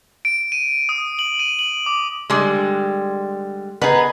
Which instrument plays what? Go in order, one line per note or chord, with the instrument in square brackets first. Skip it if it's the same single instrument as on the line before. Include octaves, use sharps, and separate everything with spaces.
[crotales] D7
D#7
D#6
F#7
D#7
F#7
D6
[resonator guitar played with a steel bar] D3 G3 G#3
[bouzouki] B3 D#4 A#4 [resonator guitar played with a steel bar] G#4 B4